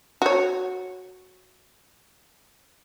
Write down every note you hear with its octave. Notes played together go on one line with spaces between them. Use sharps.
F#4 C#5